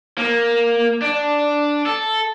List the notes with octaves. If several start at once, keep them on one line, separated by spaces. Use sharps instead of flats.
A#3
D4
A4